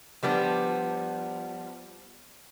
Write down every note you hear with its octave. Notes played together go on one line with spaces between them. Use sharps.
F3 G3 B3 D4